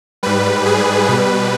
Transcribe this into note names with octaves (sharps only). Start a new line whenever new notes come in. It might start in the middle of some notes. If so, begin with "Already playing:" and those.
G#2 G3 B4
G#4
B2 G3 B4